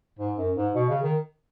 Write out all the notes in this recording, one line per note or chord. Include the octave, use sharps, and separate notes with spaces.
G#2
F#2
G#2
B2
C#3
D#3